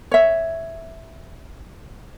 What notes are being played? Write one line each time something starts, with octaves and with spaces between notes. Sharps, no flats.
C#5 E5